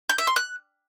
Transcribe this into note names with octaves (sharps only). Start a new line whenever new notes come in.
G6
E5
C6
F#6